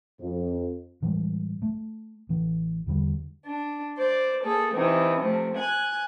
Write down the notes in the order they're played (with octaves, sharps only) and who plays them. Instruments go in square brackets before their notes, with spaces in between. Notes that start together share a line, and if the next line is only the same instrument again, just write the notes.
[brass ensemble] F2
[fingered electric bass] A2 E3 G3 G#3
A3
A1 E3
E2 D3 G3
[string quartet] D4
C5 D5
A#3 G#4 A4
C3 E3 D#4
C3 F3 A3
G#5 F#6 G#6